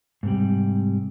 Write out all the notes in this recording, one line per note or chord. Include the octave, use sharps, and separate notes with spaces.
G#2 C3 G3